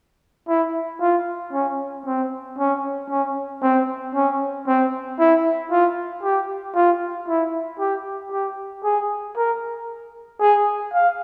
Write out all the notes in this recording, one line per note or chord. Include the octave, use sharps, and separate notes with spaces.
E4
F4
C#4
C4
C#4
C#4
C4
C#4
C4
E4
F4
G4
F4
E4
G4
G4
G#4
A#4
G#4
F5